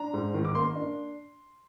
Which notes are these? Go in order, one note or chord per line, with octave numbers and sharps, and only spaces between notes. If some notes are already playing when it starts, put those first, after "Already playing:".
Already playing: D4 A#5
G#2
D#3
D6
A#3 C6
D4